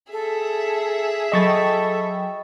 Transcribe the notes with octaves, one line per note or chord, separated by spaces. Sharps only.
G#4 A4 E5
F#3 A4 D#5 G5 B5 C#6 A6